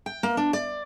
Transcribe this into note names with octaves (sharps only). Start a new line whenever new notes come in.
G5
A#3
D4
D5